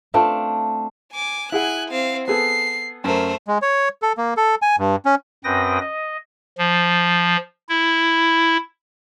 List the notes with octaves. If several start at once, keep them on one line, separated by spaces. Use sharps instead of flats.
A3 C4 D4 F4
G#5 D6
E4 G#4 F#5 G#5 F#6
C4 F5
B3 G#4 A4 C7
F#2 A3 A#4 C5
G#3
C#5
A4
A#3
A4
G#5
G2
C#4
F#2 C4 B4 G5 D#6 A#6
D#5
F3
E4